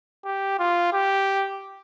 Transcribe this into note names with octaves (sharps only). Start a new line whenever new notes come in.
G4
F4
G4